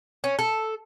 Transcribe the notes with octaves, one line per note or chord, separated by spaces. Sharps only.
C#4
A4